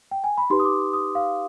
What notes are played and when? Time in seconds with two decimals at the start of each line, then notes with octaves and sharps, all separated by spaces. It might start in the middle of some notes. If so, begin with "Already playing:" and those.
0.11 G5
0.24 G#5
0.38 B5
0.50 D#4 G4 B4 C6
0.59 D#6
0.65 D6
0.93 D#6
1.15 F5